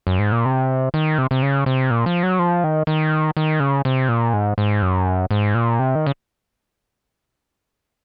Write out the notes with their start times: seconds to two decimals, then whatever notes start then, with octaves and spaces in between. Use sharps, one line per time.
0.07 F#2
0.19 G#2
0.32 A#2
0.45 C3
0.94 D#3
1.18 C3
1.31 C3
1.42 C#3
1.66 C3
1.91 A#2
2.06 F3
2.23 F#3
2.39 F3
2.64 D#3
2.87 D#3
3.37 D#3
3.60 C#3
3.85 C3
4.09 A#2
4.33 G#2
4.58 G#2
4.82 F#2
5.31 G#2
5.55 A#2
5.79 C3
5.95 D#3
6.06 C#3